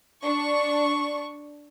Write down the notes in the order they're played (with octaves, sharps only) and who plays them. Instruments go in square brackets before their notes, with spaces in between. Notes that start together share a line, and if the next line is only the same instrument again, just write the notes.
[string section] D4 C#6